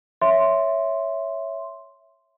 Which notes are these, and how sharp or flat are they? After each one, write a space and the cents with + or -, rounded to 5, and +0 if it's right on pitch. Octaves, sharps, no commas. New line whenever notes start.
C#5 +0 E5 +0 C6 +0